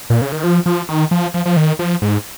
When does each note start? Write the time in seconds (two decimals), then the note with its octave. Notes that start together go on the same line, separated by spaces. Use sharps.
0.10 A#2
0.22 C#3
0.32 D#3
0.43 F3
0.66 F3
0.89 D#3
1.11 F3
1.34 F3
1.46 F3
1.57 D#3
1.79 F3
2.02 G#2